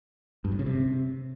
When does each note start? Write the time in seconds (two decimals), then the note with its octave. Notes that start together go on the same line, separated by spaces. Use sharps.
0.45 G2
0.52 A2
0.59 C#3
0.66 C3